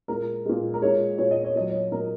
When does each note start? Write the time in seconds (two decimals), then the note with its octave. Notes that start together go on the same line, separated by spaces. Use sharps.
0.08 A#2 G#3 A#4
0.45 A#2 G#3
0.74 A#4
0.82 A#2 G#3 C#5
1.18 A#2 G#3 C#5
1.31 D#5
1.44 C#5
1.56 A#2 F#3 D#5
1.70 C#5
1.92 A#2 F#3 A#4